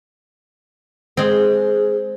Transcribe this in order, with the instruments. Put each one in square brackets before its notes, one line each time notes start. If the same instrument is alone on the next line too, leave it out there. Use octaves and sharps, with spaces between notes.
[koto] G#3 C4 [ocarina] G#4